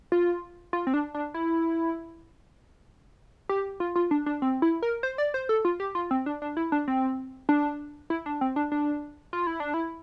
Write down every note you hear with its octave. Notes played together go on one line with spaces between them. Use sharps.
F4
F4
C4
D4
D4
E4
G4
F4
F4
D4
D4
C4
E4
A#4
C5
D5
C5
A4
F4
G4
F4
C4
D4
D4
E4
D4
C4
D4
E4
D4
C4
D4
D4
F4
E4
D4
E4